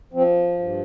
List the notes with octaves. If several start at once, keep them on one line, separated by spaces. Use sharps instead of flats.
F3 C4
G2